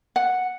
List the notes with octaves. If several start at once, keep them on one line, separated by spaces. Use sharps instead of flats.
F#5